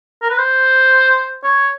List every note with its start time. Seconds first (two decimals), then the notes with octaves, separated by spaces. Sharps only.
0.22 A#4
0.30 B4
0.38 C5
1.44 C#5